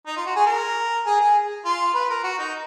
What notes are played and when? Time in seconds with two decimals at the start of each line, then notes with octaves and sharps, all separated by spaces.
0.07 D#4
0.17 F4
0.26 F#4
0.36 G#4
0.46 A#4
1.06 G#4
1.21 G#4
1.65 F4
1.94 B4
2.10 A#4
2.24 F#4
2.39 D#4